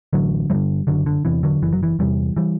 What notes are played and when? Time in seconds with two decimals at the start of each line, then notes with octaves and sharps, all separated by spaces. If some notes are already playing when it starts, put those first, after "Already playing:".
0.13 A1 D3 F#3
0.50 G2 D3 E3 G3
0.87 F#1 D3 F#3
1.06 D3
1.25 E2 C3 E3
1.43 D3 F#3
1.62 F#1 E3
1.73 F#3
1.83 E3
1.99 E2 C3 E3 G3
2.36 E3 G3